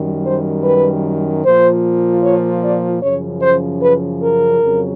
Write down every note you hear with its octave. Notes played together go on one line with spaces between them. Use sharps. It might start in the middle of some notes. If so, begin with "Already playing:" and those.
Already playing: F#2 D#3 G3
C5
B4
A#2 F3 C5
C#5
D5
F#2 C#3 F3 C#5
C5
B4
A#4
F2 C#3 F#3